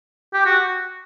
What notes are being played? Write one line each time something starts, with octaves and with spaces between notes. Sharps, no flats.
G4
F#4